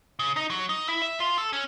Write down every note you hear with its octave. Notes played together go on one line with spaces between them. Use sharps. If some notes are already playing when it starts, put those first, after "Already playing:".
C#3
D#4
F#3
D#4
E4
E5
F4
A4
C#4